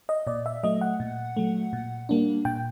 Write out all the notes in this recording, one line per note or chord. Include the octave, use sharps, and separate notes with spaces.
D#5
A#2 D5
E5
F#3 A3 D#5
F#5
A#2
F#3 A3
A#2
G3 A#3 D4
A#2 G5